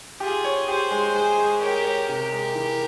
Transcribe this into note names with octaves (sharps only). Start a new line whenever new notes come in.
F4 G4 G#4
C#5
G4 G#4 C5
G#3
G#3 G#4 C5
G#3
G4 A#4 C#5
C#5
C3 G4 A#4
G#3
E3